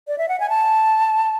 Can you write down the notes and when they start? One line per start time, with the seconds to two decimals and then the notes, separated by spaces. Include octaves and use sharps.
0.08 D5
0.18 E5
0.29 F#5
0.40 G#5
0.50 A5